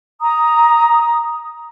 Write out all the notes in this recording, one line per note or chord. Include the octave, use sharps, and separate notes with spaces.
A#5 D#6